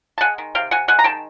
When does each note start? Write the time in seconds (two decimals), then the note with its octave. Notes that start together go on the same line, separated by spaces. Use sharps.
0.18 A5
0.21 G#3 F#5 G#5
0.38 D#3
0.55 C3 F5 G5
0.71 C3 F#5 G#5
0.88 G#3 F#5 G#5
0.99 A#5
1.04 D#3 G5 A5